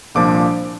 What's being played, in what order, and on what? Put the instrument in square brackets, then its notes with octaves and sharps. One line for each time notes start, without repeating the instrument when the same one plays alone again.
[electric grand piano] C2 A#2 F3 D4 D6